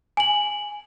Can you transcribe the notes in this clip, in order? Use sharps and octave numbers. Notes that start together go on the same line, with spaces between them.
G#5 F#7